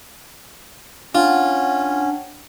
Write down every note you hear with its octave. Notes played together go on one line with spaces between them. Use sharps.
C#4 D4 F4 F#5 G5